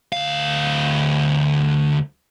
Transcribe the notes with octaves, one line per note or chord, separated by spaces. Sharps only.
D2 F5